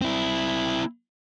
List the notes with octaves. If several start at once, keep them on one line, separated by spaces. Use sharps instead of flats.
C4 E4